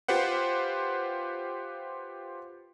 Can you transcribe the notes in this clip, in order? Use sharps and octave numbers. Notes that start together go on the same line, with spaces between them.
F4 G4 B4 C5 F#5